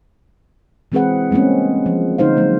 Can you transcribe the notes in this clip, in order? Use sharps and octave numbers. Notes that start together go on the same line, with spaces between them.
E3 G#3 C4 G#4 B4 F#5
G3 G#3 A#3 C4 C#4
F3
D3 A3 D#4 C5 F5
F#3 G#3 A#3